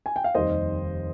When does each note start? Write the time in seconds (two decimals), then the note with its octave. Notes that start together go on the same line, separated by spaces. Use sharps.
0.06 G#5
0.16 G5
0.24 F5
0.34 F1 D#2 D#3 G3 C5 D#5